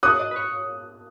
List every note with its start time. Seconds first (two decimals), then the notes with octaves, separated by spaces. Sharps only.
0.03 C#5 D#6 F#6
0.19 D#5
0.31 B4
0.36 C#5